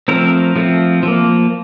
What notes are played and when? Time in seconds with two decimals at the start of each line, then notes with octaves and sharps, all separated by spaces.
0.08 F3 A3 C4 A#4
0.56 F3 A3 C4
1.03 F3 A#3